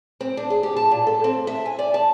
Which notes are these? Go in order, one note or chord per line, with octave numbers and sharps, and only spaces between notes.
C4
D4
G#4
G4
A5
A#2
A4
C4
E5
G#5
D5
A5